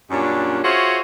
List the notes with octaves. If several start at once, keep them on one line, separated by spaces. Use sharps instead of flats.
F#2 A#2 G3 C#4 D4
F4 F#4 G#4 C5 C#5 E5